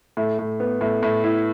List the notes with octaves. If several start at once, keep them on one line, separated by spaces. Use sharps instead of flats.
A2
A2
B3
A2
A2
E4